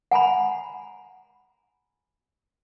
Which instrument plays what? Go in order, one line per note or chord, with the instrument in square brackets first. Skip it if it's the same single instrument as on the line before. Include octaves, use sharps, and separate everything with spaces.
[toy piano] F#5 G#5 A#5 B5